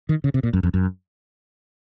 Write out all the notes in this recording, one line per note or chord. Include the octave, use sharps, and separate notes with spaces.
D#3
C#3
C3
A#2
F#2
F2
F#2